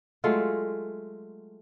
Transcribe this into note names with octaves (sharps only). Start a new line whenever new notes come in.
F#3 G#3 A3 F4